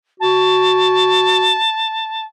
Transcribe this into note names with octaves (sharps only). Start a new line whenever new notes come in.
F#4 A5